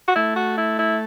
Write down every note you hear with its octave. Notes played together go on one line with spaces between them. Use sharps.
F#4
A3 E4
F#4
E4
E4